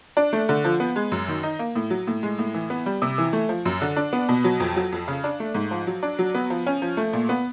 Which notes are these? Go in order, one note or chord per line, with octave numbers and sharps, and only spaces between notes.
D4
A3
D3
F3
B3
G#3
F#2
D#3
D#4
A#3
A2
F#3
A2
G#3
A2
E3
B3
G3
C3
E3
A3
F3
F#2
D3
D4
B3
B2
F#3
F2
F#3
F2
C#3
D4
A3
G#2
F3
F#3
D4
F#3
B3
F3
C#4
F3
A3
A#2
B3